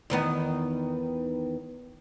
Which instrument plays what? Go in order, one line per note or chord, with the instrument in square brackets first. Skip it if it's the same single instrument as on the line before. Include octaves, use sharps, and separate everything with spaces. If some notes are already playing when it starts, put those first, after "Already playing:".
[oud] E2 D#3 B3